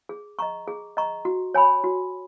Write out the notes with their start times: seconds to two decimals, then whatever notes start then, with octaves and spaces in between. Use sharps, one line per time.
0.09 G#4
0.39 D#5 A#5 C#6
0.68 G#4
0.97 D#5 A#5 C#6
1.25 F#4
1.54 C#5 G#5 B5
1.84 F#4